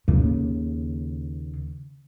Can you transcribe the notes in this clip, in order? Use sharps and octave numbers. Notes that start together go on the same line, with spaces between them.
D#2 C#3